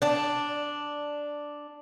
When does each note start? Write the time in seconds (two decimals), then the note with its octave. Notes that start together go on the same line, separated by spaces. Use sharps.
0.02 D4 A5